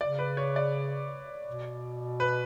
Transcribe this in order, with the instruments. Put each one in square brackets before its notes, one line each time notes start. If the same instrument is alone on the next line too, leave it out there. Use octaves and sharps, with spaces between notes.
[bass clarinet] C#3 [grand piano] D5
[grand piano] B4
C#5
D5
[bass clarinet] B2
[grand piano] B4